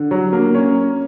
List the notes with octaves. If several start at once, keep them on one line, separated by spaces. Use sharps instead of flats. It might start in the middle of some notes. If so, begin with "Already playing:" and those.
Already playing: D3
F#3
A#3
C#4